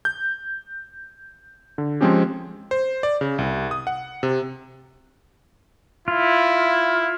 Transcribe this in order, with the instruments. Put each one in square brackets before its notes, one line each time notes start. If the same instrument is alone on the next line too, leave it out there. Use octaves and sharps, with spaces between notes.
[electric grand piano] G6
D3
F3 G#3 C4 C#4 G4
C5
D5
C#3
C2
D#6
F#5
C3
[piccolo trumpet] E4 [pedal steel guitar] F4